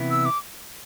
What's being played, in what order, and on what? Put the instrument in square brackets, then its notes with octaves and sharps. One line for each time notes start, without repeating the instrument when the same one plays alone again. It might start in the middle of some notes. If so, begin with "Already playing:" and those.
Already playing: [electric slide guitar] C3 E3 B3 E4
[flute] E6
D6